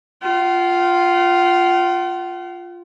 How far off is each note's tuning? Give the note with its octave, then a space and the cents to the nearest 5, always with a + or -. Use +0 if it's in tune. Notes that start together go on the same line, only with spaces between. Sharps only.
F4 +0 F#5 +45